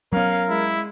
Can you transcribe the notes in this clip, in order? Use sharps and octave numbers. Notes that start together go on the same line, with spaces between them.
F#3 B3 C#4 A#4 F5
G#3 E4